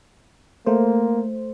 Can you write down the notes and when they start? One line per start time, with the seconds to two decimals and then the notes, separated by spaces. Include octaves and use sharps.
0.66 A3 A#3 C5